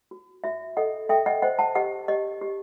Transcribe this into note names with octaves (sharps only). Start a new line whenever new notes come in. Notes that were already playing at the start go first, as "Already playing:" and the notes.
F#4
F#4 E5
A4 D#5 F#5
A4 E5 G5
D#5 F#5
C5 D#5 F#5
F#5 A5
G4 D#5 F#5
G4 D#5
G4